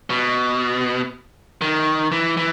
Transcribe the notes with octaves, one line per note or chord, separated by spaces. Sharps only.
B2
D#3
E3
E3